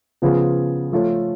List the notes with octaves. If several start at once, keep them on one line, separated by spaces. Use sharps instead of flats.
C#3 F3 B3 F4 G#4
F3 A3 F4 A4 C#5